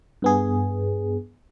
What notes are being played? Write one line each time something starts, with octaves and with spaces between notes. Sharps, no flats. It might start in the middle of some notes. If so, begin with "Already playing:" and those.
G2 B3 G#4